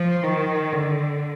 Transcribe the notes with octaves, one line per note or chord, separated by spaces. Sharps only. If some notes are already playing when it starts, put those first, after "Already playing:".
Already playing: F3
D#3
D3